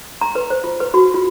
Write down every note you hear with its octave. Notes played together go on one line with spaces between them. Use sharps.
A#5
B4
C5
F4
B4
F#4
F4